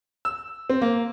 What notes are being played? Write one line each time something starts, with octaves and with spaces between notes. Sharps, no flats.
E6
C4
A#3